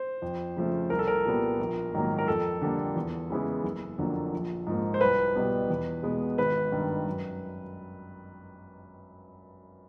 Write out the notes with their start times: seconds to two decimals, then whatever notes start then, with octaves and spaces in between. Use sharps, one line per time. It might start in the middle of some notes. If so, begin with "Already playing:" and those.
Already playing: C5
0.22 F2
0.56 C#3 F3 A3
0.90 C2 A#4
0.99 A4
1.07 A#4
1.25 A#2 G3 B3
1.59 A#1
1.93 G#2 D#3 F#3 A#3
2.18 A#4
2.28 F2 A4
2.62 D3 G3 A#3
2.96 E2
3.30 C#3 E3 G#3 B3
3.64 F#1
3.98 F2 D3 F#3 A#3
4.33 A#1
4.67 G#2 F3 A#3
4.94 C5
5.01 C2 B4
5.35 B2 G3 B3
5.70 E2
6.03 B2 G#3 B3
6.38 G#1 B4
6.72 G2 D#3
7.07 F#2